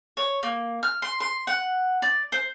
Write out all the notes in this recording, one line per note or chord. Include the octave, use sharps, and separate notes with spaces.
C#5
A#3
F6
C6
C6
F#5
D5
C5